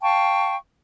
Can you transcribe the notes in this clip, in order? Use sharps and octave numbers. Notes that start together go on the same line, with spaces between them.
F5 G5 A5 C#6